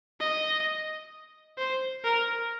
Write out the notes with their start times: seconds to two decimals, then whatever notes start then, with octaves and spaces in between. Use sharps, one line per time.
0.20 D#5
1.58 C5
2.04 A#4